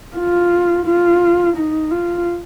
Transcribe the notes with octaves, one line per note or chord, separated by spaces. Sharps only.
F4
F4
D#4
F4